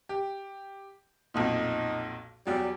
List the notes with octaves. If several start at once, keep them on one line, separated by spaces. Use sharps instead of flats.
G4
B1 F2 A#2 D#4
E2 F#3 G3